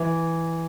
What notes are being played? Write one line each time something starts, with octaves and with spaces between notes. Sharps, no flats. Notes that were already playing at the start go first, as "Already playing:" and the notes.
Already playing: E3